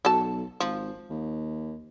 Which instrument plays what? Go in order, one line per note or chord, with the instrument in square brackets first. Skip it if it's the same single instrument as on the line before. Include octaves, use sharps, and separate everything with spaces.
[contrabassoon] B1 [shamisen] F#4 A4 A5
[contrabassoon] G#1 [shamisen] F3
[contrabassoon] D#2